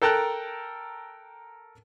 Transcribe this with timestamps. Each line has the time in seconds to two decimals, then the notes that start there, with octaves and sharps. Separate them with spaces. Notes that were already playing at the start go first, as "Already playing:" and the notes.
0.02 A4 A#4 G5 A5 A#5 F#6